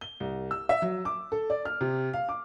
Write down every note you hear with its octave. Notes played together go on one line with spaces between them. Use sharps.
G7
C2
E6
E5
F#3
D6
A4
D5
F6
C3
F5
D6